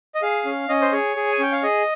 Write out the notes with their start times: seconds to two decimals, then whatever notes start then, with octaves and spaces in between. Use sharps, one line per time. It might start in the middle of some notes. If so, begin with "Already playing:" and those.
0.15 D#5
0.22 G#4 F5
0.45 C#4
0.69 C#4 D#5
0.82 C5
0.92 G#4 C#5
1.16 G#4
1.32 G#5
1.39 C#4 G5
1.52 F5
1.63 G#4 D#5